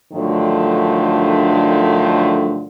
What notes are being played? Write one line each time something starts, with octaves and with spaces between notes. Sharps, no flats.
G2 D3 D#3 F3 F#3 A3